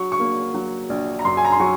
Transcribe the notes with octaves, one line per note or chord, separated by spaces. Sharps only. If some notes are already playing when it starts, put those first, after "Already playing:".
Already playing: F#3 C#6
C#6
A#3
F#3
A#1
A#5
F#2 C6
G#5
A#5
C6
F#3 C#6